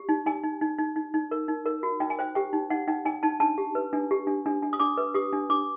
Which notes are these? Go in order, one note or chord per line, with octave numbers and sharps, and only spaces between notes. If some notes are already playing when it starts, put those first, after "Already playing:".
Already playing: G4
D#4
D#4 G#5
D#4
D#4
D#4
D#4
D#4
A#4
D#4
A#4
F#4
D#4 G5
G#5
C5 G5
G4 G5
D#4
D#4 F#5
D#4 G5
D#4 G#5
D#4 A5
D4 A5
G4
B4
D4
G4
D4
D4
D4
D#6
D4 D6
B4
G4 D#6
D4
D4 D6